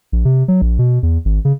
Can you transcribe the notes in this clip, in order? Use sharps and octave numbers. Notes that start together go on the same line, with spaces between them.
A#1
C3
F#3
A#1
B2
E2
G#1
C#3